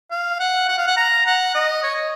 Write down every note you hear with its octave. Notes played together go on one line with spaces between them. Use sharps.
F5
F#5
F#5
F5
F#5
A#5
F#5
D#5
C#5
D#5